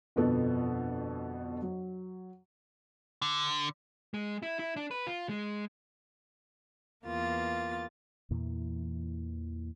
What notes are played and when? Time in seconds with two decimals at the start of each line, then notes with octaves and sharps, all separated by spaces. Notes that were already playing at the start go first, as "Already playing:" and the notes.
0.16 G1 F2 B2 B3 A4
1.62 F#3
3.22 D3
4.14 G#3
4.43 E4
4.59 E4
4.77 D4
4.91 B4
5.07 F4
5.29 G#3
7.04 E2 A#3 F4 A6
8.31 E2 A#2 E3